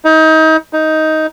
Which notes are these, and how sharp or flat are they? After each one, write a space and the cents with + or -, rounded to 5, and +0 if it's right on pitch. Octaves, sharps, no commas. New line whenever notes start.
D#4 +30
D#4 +10